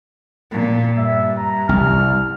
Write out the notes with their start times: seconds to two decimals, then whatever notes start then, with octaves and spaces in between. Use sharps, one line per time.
0.52 A#2
0.97 G2 E5
1.37 A#5
1.69 C2 F6